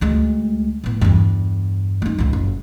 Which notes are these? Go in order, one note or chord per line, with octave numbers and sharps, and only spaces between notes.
D2 G#3
A2 B3
E2 G2
A#3 D#4
C#2 G#2
F#1